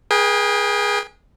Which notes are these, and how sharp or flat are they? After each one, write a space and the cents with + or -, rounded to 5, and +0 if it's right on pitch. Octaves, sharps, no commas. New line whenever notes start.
G#4 +0 B4 -40 G5 +30